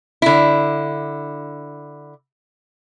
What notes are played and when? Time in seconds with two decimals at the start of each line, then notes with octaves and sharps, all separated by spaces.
0.22 D3 E4